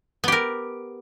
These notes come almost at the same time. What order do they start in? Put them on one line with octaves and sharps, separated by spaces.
B3 G4 A#4